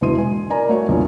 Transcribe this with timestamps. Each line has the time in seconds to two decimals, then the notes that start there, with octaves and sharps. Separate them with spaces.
0.01 E1 B2 E3 C6 D#7
0.18 G#5
0.50 A#4 D5 G#5 A#5
0.69 A3 F#4 C#5
0.88 A#1 E2 F4